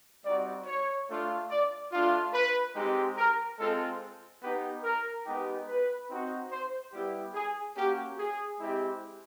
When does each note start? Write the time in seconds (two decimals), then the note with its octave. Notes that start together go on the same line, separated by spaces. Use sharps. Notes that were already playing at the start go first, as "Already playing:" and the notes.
0.24 G3 C4 D#4 F#4 D5
0.65 C#5
1.08 A3 D4 F4
1.49 D5
1.91 A3 D4 F4
2.32 B4
2.75 G#3 C4 D#4 G4
3.16 A#4
3.58 G#3 C4 F4 A4
4.42 B3 D#4 G4 B4
4.83 A#4
5.25 G#3 B3 D#4 G4
5.68 B4
6.09 C4 D#4 F#4
6.51 C5
6.92 G3 B3 E4 G4
7.34 G#4
7.76 A#3 C#4 F#4 G4
8.18 G#4
8.59 G#3 C4 E4 G4